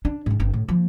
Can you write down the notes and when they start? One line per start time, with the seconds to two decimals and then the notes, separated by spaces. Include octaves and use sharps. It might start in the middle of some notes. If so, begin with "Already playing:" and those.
0.05 D4
0.26 G#2 D#3
0.40 G1 C4
0.54 A2
0.69 F3 A#3